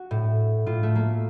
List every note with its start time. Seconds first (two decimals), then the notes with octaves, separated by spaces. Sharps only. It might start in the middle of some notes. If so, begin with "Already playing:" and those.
Already playing: F#4
0.11 A2
0.66 A2 F4
0.83 A3
0.95 A#3